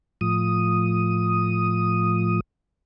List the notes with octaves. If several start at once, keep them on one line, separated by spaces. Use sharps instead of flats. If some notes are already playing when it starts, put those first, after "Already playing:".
A2 F3 D#6